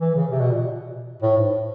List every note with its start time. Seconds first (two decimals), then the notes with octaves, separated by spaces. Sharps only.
0.01 E3
0.15 C#3
0.31 C3
0.40 B2
0.51 A#2
1.22 A2
1.38 G#2